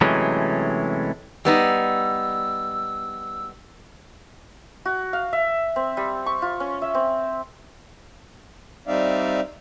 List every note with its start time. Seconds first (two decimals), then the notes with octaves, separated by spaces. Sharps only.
0.01 C3 E3 F#3 G#3 A3 C#4
1.45 G3 B3 D#4 E6
4.85 F#4
5.13 F5
5.33 E5
5.76 C4
5.97 G3
6.26 C#6
6.42 F4
6.60 C#4
6.82 E5
6.95 C4
8.88 G3 C4 D#4 D5 E5 F5